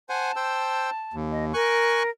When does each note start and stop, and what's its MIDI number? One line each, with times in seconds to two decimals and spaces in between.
0.09 0.32 72
0.09 0.32 78
0.09 0.32 80
0.09 1.16 81
0.36 0.90 72
0.36 0.90 79
0.36 0.90 88
1.14 1.53 39
1.31 1.45 75
1.54 2.10 70
1.54 2.03 80
1.54 2.03 85
1.54 2.03 90